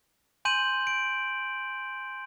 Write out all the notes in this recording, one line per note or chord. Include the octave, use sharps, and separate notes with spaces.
G#5 C6 G6 D#7 F#7
D7